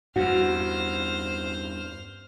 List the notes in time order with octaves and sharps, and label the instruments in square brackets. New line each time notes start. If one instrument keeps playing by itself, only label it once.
[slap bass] E2 G2 [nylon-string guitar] F#4 [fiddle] C5 F6